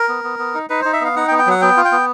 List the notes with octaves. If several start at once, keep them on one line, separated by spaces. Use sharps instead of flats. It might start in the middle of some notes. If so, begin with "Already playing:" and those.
Already playing: A#4
B3
B3
B3
D#4
D#4 B4
D#4 C5
E5
B3 F5
D#4 F#5
G5
B3
G5
F#3 F#5
B3 G5
F4
G5
B3